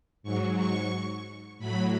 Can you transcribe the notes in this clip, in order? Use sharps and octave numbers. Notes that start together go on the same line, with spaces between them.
G#2 F#3 C#6
C#6
A2 F#3 B5